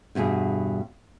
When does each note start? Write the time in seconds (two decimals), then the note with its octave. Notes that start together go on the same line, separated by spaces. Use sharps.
0.15 E2 G2 B2 G#4